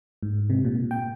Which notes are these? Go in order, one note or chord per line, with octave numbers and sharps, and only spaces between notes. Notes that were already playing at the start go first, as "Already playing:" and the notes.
G#2
C3
A#2
G5